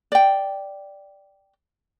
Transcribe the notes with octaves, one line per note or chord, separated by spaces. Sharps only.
D5 G5